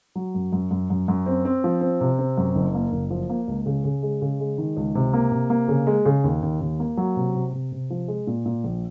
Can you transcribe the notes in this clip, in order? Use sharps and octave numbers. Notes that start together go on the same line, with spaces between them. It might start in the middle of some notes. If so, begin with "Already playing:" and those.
F#3
F#2
F#2
F#2
F#2
F#2
C4
C4
F3
C4
C3
C4
F#2
F#1
A#3
F#1
F3
A#3
C#2
C#3
C#3
G#3
C#3
G#3
D#3
C#2
C3
A#3
C3
A#3
C#3
G#3
C#3
D#2
D#2
D#2
A#3
F#3
C3
C3
C3
C3
F3
G#3
A#2
A#2
A#1